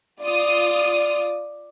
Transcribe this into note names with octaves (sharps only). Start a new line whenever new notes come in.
F4 D5 D#6